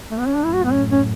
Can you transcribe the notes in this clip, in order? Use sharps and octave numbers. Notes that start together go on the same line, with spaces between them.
A3
B3
C#4
F#2 A2 D4
E4
F#4
B3
C#4
C#4